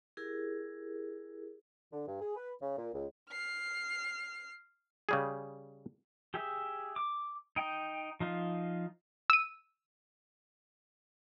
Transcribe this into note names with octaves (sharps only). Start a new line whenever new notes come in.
E4 G4 G#4 A#4
D3
G2
G#4
B4
C#3
A#2
C#2
F6 C7
C#3 G3 G#4
G4 G#4 E5
D6
D#4 G5
F3 D#4 F4
E6 D#7